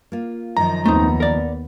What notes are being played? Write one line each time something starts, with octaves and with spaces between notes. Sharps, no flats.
A#3 F4
F#2 D#3 F3 A#5
D#2 A3 B3 C4 D#4
A#4 D5